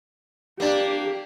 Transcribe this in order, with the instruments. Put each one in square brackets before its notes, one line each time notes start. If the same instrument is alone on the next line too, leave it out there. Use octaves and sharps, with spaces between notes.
[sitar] A#3 D4 [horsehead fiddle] G4